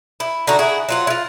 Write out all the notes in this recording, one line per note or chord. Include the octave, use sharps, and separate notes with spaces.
E4
D3 D#4 F#4
E4 F#4 G#4
F#3 F4 F#5
E4 F4